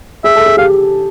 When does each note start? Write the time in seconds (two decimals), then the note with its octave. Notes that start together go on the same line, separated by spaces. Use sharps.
0.24 G#4 E5
0.36 A4
0.46 G#4
0.57 G4 F5